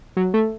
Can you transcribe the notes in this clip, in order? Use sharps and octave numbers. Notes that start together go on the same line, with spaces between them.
F#3
A3